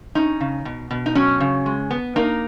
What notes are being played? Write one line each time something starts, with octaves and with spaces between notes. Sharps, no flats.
C#4 D#4
C#3
B2
B2
D#4
F#3 C#4
C#3
G#3
B3
A#3 D#4